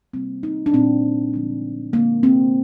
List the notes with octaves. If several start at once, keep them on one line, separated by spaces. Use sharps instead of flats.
C3 G3 A#3 C4
D#4
D4
A#2 G3 A#3 C4
D3 F3 G#3
D3 G#3 A#3
C4